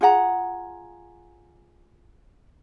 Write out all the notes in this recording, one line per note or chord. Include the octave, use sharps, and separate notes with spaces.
F4 G#4 F#5 A#5